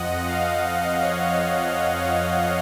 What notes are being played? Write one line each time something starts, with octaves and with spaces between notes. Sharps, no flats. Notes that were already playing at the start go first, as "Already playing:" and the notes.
Already playing: F2 F3 D#5 F#5
F5
C#5